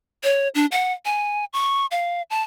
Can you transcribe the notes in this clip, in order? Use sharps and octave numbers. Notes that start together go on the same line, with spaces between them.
C#5
D4
F#5
G#5
C#6
F5
A5